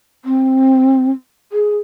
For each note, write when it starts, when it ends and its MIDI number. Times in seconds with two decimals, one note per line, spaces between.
0.25 1.10 60
1.52 1.78 68